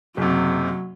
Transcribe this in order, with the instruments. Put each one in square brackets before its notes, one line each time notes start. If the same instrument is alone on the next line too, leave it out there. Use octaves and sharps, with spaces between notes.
[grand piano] F#1 C3 [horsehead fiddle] F#3